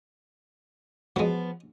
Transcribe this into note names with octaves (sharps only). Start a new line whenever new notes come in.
F3 F#3 G#3 B3